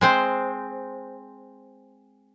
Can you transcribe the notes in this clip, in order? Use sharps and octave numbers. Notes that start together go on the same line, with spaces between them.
G#3 C4 C5